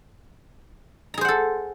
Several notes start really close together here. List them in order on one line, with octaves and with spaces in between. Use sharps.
A#5 G#4 C5 F#5 A4